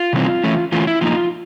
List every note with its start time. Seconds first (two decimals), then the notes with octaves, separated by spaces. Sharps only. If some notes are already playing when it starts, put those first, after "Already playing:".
Already playing: F4
0.13 C3 E3 G3 C4 D#4
0.44 E3 A3 C#4
0.72 E3 A3 C#4 F4
0.87 E4
1.01 F3 A#3 D#4 F4